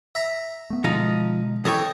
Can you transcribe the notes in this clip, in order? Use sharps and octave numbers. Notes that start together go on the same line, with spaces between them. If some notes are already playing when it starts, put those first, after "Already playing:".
E5 A#5
A3 B3
B2 D3 F3 G#3 D#4
E3 A4 C#5 D#5 G5